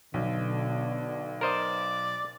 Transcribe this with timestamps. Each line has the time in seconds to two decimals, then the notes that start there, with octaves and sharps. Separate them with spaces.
0.14 B1 B2 D3
1.41 A#4 C5 D5 D#5